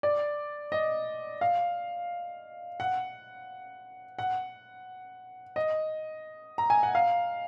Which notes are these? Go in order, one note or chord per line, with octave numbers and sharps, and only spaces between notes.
D5
D#5
F5
F#5
F#5
D#5
A#5
G#5
F#5
F5